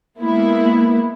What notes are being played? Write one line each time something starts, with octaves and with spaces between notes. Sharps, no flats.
G#3 A#3 B3 E4